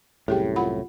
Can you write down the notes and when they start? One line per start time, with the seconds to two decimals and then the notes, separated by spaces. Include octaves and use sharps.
0.28 C2 F#2 A2 G4 G#4 G5
0.56 F4 F#5 B5